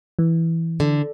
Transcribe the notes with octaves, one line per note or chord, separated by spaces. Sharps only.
E3
D3